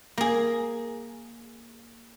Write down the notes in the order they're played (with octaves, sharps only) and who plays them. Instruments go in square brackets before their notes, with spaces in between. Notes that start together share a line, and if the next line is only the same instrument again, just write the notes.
[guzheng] A#3 G#4